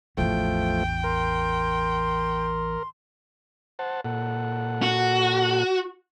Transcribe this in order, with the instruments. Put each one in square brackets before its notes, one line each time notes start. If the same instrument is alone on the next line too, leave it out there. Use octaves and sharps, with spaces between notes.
[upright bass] A1 E2 [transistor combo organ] F3 A3 [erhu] G5
[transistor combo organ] A#4 [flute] C6
[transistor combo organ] C5 F#5 A5
A#2 A4 F#5
[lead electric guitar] F#4